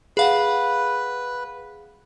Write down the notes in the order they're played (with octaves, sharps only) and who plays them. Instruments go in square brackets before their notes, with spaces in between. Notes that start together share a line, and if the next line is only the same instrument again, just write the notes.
[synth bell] G#4 F5 F#5 [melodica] B4